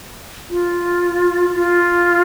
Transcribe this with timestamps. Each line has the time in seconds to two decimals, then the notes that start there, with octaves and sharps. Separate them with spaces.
0.50 F4
1.54 F4